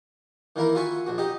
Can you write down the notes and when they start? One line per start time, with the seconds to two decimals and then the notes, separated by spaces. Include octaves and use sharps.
0.56 D#3 E3 A#3 E4 A#4
0.75 F4 F#4 E5 G#5 C6 C#6
1.06 A#1 F#4
1.18 D#4 G4 D#5